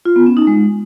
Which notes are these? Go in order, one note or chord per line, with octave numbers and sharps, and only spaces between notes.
F4
B3
C#4
D#4
G#3